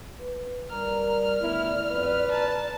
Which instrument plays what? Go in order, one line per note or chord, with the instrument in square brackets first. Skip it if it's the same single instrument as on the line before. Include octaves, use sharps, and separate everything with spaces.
[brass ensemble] B4
[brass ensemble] G3 A#4 D5 [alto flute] A#5 [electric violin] F6
[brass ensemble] G1 A2 B3 [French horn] E4 [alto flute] D5
[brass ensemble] F2 [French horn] B4
[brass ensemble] A#2 A#5 [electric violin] A5